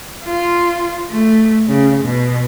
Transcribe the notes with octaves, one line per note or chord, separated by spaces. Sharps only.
F4
A3
C#3
B2